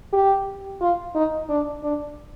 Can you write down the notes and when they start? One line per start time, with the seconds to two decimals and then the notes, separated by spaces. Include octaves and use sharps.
0.13 G4
0.81 F4
1.15 D#4
1.49 D4
1.83 D4